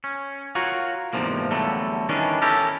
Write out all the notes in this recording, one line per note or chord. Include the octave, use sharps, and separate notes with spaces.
C#4
F4 F#4 A#4 C#5
E2 G#2 C3 F3 A#3
E2 D3 F#3 G3 A3
D#3 E3 G3 C#4 D4
C#4 E4 G4 A4 A#4